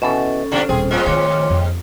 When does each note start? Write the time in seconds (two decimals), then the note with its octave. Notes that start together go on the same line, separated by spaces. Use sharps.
0.02 B2 E3 C#4 A4
0.52 B2 F3 D4
0.69 D#1 C4 G#4
0.91 A2 F3 G#3 F4
1.07 D#3 A3 C#5 C6 D6
1.50 F2